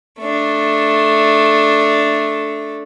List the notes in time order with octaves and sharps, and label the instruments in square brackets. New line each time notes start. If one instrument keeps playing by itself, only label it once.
[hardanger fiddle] A3 D4